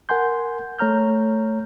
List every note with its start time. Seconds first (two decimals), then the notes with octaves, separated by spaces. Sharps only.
0.09 A#4 F#5 G#5 C6 G6
0.79 A3 C#5 A#5 F6 G6